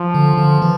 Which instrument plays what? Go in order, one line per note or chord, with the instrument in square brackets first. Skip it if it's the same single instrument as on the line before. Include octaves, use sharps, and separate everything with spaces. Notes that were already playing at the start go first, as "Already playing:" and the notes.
Already playing: [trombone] F3
[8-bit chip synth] D3
D3
E3